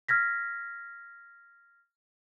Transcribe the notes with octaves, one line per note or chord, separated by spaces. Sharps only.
F6 G#6 A#6 B6